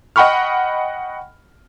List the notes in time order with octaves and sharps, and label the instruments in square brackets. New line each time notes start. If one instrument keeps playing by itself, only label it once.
[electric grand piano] D#5 F#5 G5 B5 C#6 F6